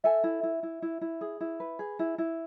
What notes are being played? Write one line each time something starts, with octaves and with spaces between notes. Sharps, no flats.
A4 E5 G#5
E4
E4
E4
E4
E4
G#4
E4
B4
G#4
E4
E4